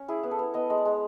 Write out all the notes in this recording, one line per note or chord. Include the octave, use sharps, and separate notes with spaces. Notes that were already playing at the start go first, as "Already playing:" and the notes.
Already playing: C#4
E4 G#4
B3
A4
B3
B3 D#5
G#3 D#5
D5
G#3